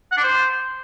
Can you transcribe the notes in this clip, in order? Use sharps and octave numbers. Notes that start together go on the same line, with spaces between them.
F#5
D4
C5